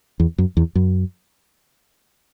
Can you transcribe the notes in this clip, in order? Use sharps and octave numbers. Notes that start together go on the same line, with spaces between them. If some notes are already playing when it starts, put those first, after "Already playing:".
E2
F#2
E2
F#2